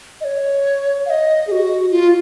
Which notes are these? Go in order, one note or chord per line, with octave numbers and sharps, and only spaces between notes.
D#5
C#5
F5
D#5
G#4
F#4
F4